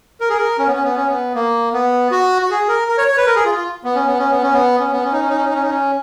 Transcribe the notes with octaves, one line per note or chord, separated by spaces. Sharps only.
A#4
G#4
A#4
C#4
B3
C#4
B3
C#4
B3
A#3
B3
F#4
F#4
G#4
A#4
A#4
C#5
C#5
B4
A#4
G#4
F4
F4
B3
C#4
B3
C#4
B3
C#4
B3
C#4
B3
C#4
D#4
C#4
D#4
C#4
D#4
C#4
D#4
C#4